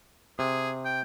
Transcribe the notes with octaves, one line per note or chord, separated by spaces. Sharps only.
C3 G#4
G5